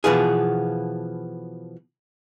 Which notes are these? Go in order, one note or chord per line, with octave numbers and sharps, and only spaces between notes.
B2 E3 F3 B3 F4 G#4